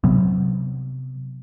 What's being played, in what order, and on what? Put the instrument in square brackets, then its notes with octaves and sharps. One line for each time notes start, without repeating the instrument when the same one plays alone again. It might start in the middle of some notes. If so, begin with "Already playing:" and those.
[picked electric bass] C3 F#3 B3